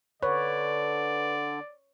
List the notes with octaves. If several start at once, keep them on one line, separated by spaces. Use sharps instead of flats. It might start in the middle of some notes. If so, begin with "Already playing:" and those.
D3 B4 C#5 D5